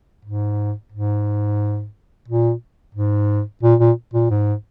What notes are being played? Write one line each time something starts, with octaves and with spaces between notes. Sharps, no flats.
G#2
G#2
A#2
G#2
A#2
A#2
A#2
G#2